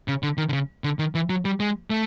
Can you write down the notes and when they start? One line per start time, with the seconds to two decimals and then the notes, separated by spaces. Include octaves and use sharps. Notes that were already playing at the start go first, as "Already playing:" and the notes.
0.08 C#3
0.23 D3
0.38 D#3
0.49 D3
0.53 C#3
0.84 D3
0.99 D#3
1.15 E3
1.30 F#3
1.45 G3
1.60 G#3
1.90 A3